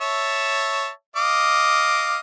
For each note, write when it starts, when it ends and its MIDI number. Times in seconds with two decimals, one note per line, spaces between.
0.01 0.89 73
0.01 0.89 76
0.01 0.89 81
1.16 2.18 75
1.16 2.18 77
1.16 2.18 86